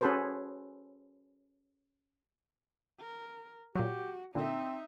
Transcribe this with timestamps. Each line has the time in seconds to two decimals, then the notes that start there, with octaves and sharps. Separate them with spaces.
0.01 C#4 F#4 G#4 A4 B4 C5
3.00 A#4
3.75 A#2 F#3 F#4 G4
4.35 A#2 D3 C4 D#4 E5